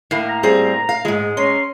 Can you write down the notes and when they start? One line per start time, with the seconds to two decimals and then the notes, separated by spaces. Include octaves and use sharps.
0.11 A2 A#3
0.28 A#5
0.43 G3 C4 G#4
0.89 F5
1.05 E2 G#2 G#3
1.37 C#4 A#5 C6